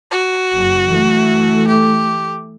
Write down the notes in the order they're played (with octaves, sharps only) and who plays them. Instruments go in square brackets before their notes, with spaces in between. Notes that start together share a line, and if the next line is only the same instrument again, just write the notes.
[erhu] F#4
[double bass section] F#1
E3 A3
[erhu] G4